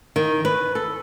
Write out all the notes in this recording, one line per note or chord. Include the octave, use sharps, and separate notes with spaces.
D#3
B4
A4